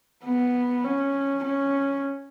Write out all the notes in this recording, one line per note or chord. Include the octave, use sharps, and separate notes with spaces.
B3
C#4
C#4